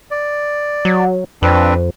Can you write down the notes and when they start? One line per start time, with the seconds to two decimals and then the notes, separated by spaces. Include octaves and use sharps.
0.11 D5
0.85 F#3
1.42 F2 C4 D4 B4